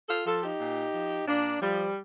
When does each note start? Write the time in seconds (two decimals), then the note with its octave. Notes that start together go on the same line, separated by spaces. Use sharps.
0.09 F4 A4
0.26 F3 F4 A4
0.43 D#4 G4
0.60 A#2
0.94 F3
1.27 A#2 A#3 D4
1.61 F3 G3